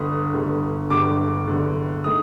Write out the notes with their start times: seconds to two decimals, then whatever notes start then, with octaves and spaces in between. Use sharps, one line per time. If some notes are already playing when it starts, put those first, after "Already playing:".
Already playing: G1 G2 D3 D#6
0.34 G1 G2 D3
0.90 G1 G2 D3 D6
1.47 G1 G2 D3
2.04 D#3 A3 D#6